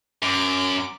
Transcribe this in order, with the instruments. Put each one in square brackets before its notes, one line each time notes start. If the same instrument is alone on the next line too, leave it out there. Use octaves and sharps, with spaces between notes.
[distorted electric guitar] F#2 [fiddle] D6